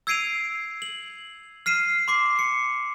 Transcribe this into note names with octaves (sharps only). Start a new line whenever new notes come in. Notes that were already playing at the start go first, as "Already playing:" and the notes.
E6 G#6 C7 D7 D#7 F7
F#7
F6 C7 D#7 E7
C6 D6 C7
C#7